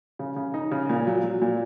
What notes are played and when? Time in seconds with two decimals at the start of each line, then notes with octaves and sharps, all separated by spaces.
0.19 C#3
0.36 C#3
0.54 D#4
0.71 C#3
0.89 A#2
1.07 F#3
1.23 F#3
1.42 A#2